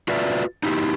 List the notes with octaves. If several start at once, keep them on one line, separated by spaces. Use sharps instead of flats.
F4 F#4 B4 D5 E5
D#4 E4 G4